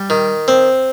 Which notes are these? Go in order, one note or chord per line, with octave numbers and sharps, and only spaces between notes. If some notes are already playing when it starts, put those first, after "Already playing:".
Already playing: G3
D#3
C4